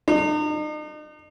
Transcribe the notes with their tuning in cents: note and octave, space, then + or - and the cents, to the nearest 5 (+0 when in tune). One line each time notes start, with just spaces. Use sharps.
D#4 -40